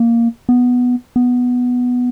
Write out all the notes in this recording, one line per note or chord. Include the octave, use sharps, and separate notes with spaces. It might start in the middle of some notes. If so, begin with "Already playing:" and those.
Already playing: A#3
B3
B3